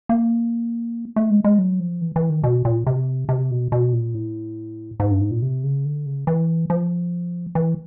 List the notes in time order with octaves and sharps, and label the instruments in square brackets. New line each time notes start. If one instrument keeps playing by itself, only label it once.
[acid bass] A#3
A3
G#3
G#3
F#3
F3
E3
E3
D#3
B2
A#2
C3
C3
B2
B2
A#2
A2
G#2
G2
G#2
A#2
C3
C#3
D3
C#3
E3
F3
E3